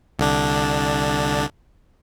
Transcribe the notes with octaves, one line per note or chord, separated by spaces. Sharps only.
C2 D3 D4